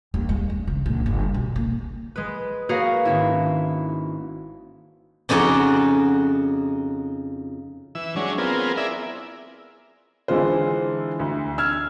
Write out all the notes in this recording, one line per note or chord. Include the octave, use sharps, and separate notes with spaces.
D#2
G#3
G#3
C#3
A#1
G1
B2
A#3
G#3 B4
A#3 F#4 G#4 B4 C#5 F5
G#1 C#4 E4
F2 C#3 D#4 F#4 D5
E3 E6
F#3 G#3 C#4 D4
B3 C4 F4 G#4 A#4
E4 G#4 A#4 D5 E5
D3 E3 G#3 F4 C5
D2
E6 F6 G#6